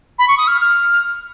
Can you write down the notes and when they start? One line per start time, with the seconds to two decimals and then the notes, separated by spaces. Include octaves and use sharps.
0.18 B5
0.28 C#6
0.38 D#6
0.47 F6
0.61 F6